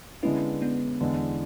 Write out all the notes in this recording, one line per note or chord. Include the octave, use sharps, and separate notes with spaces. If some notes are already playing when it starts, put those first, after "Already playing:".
D3 G#3 B3 C#4 E4
B3 D4
E2 D3 G#3